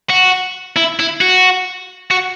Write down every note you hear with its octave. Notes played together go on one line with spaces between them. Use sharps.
F#4
E4
E4
F#4
F#4